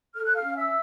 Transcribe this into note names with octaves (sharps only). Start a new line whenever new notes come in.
A4 F6
F#6
F5 F6
C#4
E5 E6